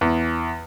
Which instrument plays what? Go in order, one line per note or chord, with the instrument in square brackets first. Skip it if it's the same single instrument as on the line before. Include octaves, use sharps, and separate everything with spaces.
[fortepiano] E2